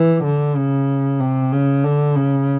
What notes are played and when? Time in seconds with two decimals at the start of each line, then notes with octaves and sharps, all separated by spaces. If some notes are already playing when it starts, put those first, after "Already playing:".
Already playing: E3
0.24 D3
0.56 C#3
1.20 C3
1.52 C#3
1.84 D3
2.16 C#3